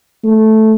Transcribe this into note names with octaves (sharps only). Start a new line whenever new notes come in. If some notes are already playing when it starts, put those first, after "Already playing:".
A3